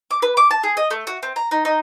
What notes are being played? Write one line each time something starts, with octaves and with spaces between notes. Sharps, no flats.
D6
B4
D6
A5
G#4
D#5
A3
F#4
C4
A#5
D#4
D#4